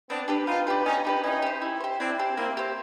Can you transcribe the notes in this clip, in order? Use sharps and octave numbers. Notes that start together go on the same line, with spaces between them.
B3 C4 D4
D4 G4 B4
B3 D#4 F4
D4 G4 B4
B3 C#4 D#4
D4 G4 B4
C#4 D#4 E4
G4 C5
E4
G4 C5
C4 D4 E4
G4 C5
A#3 C4 E4
G4 C5